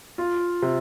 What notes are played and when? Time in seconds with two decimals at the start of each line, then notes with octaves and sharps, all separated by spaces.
0.18 F4
0.62 C3